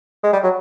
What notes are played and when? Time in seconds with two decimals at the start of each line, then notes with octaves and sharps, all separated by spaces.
0.24 G#3
0.33 G3
0.44 F#3